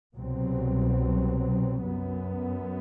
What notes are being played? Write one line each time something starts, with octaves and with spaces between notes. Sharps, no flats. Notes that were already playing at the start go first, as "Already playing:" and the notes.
C2 B2 F#3 C4
F#2 F#3 B3